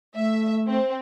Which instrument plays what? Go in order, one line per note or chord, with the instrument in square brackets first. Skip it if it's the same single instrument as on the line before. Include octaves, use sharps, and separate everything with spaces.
[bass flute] A3 [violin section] E5
[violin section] C4